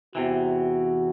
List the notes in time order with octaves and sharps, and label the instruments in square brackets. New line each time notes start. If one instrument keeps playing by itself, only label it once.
[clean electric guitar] E2 C3 E3 [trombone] F#4